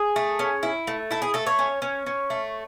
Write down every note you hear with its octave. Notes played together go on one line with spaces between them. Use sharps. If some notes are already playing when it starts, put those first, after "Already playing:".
Already playing: G#4
A3
C#4
E4
A3
E4 A4
G#4
A3 A4
C#5
C#4
C#4
C#4
A3